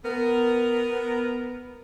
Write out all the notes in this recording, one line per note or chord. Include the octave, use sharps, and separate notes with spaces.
B3 A#4